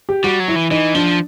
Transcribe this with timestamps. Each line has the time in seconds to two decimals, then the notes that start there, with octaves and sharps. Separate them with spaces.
0.09 G4
0.24 G3 F#4
0.40 F#3
0.48 E4
0.56 E3
0.71 E3 D#4
0.94 F3 D4